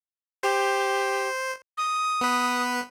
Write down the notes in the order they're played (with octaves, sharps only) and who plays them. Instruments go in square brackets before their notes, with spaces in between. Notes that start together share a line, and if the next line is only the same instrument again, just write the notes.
[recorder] G4 [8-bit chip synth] C5
[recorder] D#6
[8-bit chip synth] B3 B4